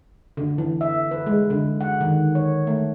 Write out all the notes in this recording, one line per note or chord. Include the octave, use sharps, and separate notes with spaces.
D3
E3
E5
B4
G#3
D3
F#5
D#3
C#5
A3